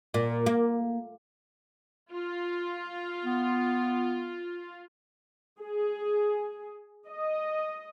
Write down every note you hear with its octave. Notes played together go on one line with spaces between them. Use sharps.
A#2
A#3
F4
B3
G#4
D#5